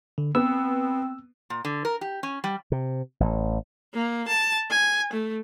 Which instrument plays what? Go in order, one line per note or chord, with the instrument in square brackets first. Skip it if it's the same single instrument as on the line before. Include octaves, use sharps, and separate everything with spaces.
[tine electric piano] D3
[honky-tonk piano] B3 [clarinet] C4 [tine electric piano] E6
[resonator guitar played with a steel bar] A#2
D3
A#4
G4
C#4
G3
[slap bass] C3
A1
[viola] A#3
A5
G#5
A3